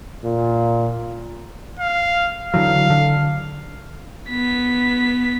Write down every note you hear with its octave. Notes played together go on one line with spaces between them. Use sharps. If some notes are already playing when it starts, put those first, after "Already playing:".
A#2
F5
D3 E3 F#3 F5
D3
B3 B6